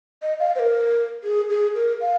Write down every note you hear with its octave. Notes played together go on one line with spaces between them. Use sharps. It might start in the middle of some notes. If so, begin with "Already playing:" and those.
D#5
F5
C5
A#4
G#4
G#4
A#4
F5